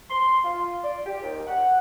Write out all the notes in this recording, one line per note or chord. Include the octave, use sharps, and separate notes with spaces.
C6
F4
D5
G4
D#2
F#5